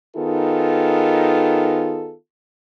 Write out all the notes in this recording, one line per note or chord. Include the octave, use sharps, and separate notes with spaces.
D#3 B3 D#4 F4 G#4 A4